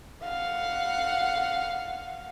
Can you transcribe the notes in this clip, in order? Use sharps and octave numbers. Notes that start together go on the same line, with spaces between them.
F5 F#5